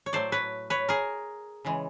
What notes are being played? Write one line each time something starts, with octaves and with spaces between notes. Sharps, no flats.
C#5
A2 F#3 A3 C5 D5
B4 C#5
B4 C#5
G#4 A#4
C#3 E3 G#3